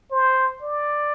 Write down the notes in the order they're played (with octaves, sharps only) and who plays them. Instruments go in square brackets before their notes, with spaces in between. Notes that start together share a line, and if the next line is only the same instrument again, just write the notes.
[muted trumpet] C5
D5